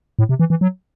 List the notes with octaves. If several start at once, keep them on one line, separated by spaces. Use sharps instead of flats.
A2
C3
E3
E3
F#3